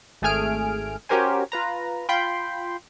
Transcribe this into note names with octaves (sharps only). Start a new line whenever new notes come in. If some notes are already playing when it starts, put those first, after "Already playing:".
G#1 A3 G#4 G#5 F6 D7
C#4 F#4 G4 A#4 C5 G#5
F4 B4 A#5
F4 G5 B5 C6